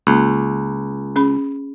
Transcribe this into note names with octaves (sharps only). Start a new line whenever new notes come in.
C#2 A#3
C#4 G#4 B5